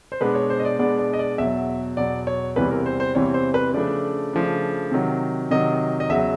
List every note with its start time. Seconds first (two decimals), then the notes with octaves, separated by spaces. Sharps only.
0.12 C5
0.21 B2 G#3 B3 D4 B4
0.35 C#5
0.50 C5
0.60 D#5
0.65 D5
0.79 B2 G#3 B3 D4 D5
0.99 D5
1.13 D#5
1.19 D5
1.38 E2 B2 F#3 E5
1.97 E2 B2 F#3 D5
2.27 C#5
2.56 E2 C3 E3 G3 C4 B4
2.71 A#4
2.86 C5
3.00 C5
3.15 E2 C3 E3 G3 C4 C#5
3.34 C5
3.54 B4
3.73 C#3 F3 A3 D4 D5
4.33 C#3 F3 A3 D4
4.91 C3 D#3 F#3
5.51 C3 D#3 F#3 D#5
6.00 D#5
6.09 E2 C#3 F#3 E5